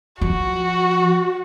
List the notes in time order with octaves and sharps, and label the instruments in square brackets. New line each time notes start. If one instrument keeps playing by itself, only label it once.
[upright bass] F3 [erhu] F#4